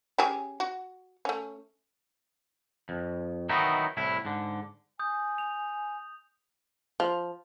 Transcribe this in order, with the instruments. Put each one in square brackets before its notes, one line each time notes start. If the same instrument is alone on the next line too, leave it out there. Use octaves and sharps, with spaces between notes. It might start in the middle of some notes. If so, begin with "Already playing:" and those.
[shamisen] C#4 G4 G#4
F#4
A3 C#4
[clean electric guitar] F2
D#3 E3 F#3 B3 D#4 E4
C2 A2 E4
G#2 D3
[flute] G#5 [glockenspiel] D#6 G6
[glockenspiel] F7
[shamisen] F3